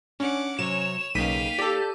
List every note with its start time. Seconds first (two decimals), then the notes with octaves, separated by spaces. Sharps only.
0.20 C#4 D4 F#5 D6
0.59 C3 F#3 C#5 E7
1.15 B1 C#3 A#3 D#4 F5 G5 B6 D#7
1.59 G4 A4 D5